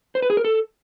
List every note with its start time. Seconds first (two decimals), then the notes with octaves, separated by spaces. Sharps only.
0.15 C5
0.22 B4
0.30 G#4
0.37 A#4
0.45 A4